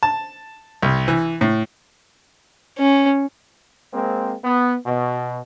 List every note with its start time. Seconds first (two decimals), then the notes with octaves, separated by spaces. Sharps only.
0.03 A5
0.83 C2
1.08 E3
1.41 A2
2.78 C#4
3.94 G#3 A#3 C4
4.44 B3
4.86 B2